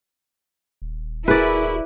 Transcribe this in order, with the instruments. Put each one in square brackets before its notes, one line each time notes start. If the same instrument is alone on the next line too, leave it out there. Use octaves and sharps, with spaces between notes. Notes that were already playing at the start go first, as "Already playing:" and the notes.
[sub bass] D#1
[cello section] E4 [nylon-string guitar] F#4 G#4 A#4 [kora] B4 D5